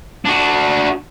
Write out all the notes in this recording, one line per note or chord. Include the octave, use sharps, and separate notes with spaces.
D4 F#4